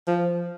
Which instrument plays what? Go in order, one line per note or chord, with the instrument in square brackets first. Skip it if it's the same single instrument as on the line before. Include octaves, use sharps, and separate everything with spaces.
[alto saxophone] F3